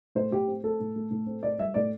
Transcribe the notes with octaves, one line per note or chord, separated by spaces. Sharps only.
A2 C5
A2 G4
C4
A3 A4
A2
A3
A2
C4
A2 D5
G3 E5
A2 D5